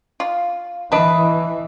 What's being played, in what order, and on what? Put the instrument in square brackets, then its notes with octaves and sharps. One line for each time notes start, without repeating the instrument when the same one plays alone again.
[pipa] F4
[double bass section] E3 [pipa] D4 B4 [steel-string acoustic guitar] D#5 E5